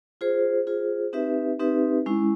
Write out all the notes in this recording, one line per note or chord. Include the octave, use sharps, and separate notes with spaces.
F4 G#4 C5
F4 G#4 C5
C4 D#4 G4 B4 E5
C4 D#4 G4 B4 E5
G#3 C#4 E4